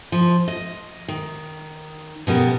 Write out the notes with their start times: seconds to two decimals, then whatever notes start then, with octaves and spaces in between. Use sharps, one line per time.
0.12 F3
0.48 D#5
1.08 D#3
2.27 B2 G3 B3 A#4